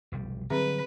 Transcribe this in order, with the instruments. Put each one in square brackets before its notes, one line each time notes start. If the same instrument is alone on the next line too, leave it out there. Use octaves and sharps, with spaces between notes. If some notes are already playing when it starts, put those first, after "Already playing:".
[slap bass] F1 B1 G3
[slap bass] D3 F#3 G3 [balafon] C4 G#4 E5 [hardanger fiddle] B4